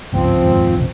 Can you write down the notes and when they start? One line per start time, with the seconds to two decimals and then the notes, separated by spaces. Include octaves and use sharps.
0.13 G#1 C#2 G2 F3 C4
0.43 F1 D#2 G#2
0.75 A#1 F2 C3